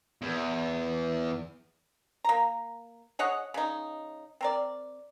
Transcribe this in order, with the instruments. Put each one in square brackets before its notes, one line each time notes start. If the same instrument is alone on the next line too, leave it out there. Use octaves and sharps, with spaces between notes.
[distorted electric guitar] E2
[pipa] A#3 A#5
G#4 C#5 D#5 F#5
C#3 D#4
C4 A#4 D5